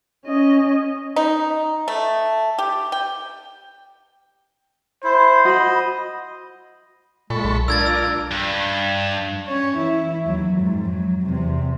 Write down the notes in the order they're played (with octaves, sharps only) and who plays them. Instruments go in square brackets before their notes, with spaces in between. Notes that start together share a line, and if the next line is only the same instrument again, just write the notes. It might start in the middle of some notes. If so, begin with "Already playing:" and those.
[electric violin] C#4 D#5
[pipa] D#4
A3
G4
G5
[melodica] E4 [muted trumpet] C5
[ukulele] F#4 B5 [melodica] D#5
[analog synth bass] A#2 [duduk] G#3 [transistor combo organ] A4 B5 C#6
[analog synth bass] B1
[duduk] D4 [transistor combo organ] F4 A#4 D5 [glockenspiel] E6 G#6 A6
[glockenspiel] E6
[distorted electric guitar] G2
[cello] C#4 C#5
E3 E4
D#2 F#3
F2 G#2
F#3
E2 C3